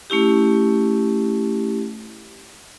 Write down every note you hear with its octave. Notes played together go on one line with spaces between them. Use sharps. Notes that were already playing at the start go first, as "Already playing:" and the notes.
A3 C#4 E4 G4